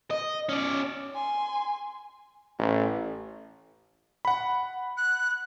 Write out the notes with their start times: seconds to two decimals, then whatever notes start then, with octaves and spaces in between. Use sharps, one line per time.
0.11 D#5
0.49 C#4 D5
1.15 G#5 C6
2.59 A1
4.25 F#5 B5
4.97 F#6